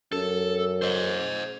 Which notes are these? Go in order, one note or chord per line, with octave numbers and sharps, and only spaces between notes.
F#2 A4
C5 D#5